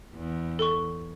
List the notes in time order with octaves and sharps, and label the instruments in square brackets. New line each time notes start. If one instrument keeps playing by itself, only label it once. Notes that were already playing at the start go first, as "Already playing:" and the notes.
[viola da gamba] E2
[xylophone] A4 C#6